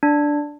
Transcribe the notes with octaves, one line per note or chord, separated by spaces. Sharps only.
D4